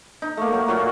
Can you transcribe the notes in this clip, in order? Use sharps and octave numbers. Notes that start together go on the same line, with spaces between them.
D#4
A3 A#3
F#3
A#2 F#3 F#4